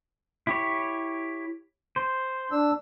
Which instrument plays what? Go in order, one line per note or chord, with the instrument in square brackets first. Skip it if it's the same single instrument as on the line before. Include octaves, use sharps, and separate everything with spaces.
[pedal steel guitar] E4 G4 C#5
C5
[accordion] D4 E6